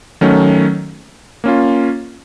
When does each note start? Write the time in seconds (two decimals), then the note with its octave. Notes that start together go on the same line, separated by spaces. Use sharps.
0.21 D#3 F#3 A3 C#4
1.44 A#3 C#4 F4